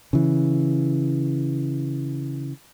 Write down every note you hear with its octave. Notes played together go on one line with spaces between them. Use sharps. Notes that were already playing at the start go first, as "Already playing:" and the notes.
C#3 E3